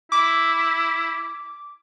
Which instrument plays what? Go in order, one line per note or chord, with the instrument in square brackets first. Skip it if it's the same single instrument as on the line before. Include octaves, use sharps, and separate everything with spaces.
[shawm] E4 [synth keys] D6